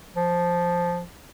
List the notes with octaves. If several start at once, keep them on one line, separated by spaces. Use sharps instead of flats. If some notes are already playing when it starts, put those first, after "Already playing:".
F3